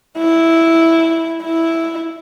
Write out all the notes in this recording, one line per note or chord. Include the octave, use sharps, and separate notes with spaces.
E4
E4